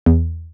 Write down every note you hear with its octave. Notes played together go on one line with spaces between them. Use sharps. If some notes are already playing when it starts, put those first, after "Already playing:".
E2